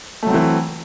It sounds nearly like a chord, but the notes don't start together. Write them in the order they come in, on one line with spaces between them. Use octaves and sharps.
A3 F#3 C4 E3